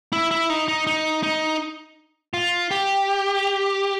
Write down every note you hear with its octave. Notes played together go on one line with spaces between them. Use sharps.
E4
E4
D#4
D#4
D#4
D#4
F4
G4